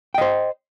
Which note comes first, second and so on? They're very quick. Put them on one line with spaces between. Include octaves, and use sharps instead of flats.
G5 D#5 C5